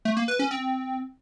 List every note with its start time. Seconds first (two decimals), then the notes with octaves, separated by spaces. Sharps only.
0.05 A3
0.17 A#3
0.28 B4
0.39 C#4
0.51 C4